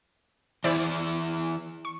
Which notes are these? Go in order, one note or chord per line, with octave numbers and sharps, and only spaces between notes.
E3 E4 G#4 C5 D5
C#6